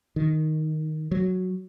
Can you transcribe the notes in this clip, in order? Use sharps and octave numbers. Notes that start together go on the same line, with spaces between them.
D#3
F#3